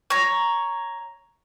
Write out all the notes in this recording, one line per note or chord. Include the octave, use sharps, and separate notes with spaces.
C#5 A#5